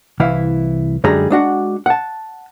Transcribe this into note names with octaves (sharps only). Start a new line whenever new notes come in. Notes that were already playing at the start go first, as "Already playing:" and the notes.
C2 E3 E4 F5
F#2 D3 G3 G#3 G#4 A#5
G#3 D4 F#4 F#5
F#5 A5